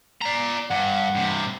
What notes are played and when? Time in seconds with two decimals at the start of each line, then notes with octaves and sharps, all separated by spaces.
0.21 D5 A#5
0.71 G2 F#5
1.14 G2 C3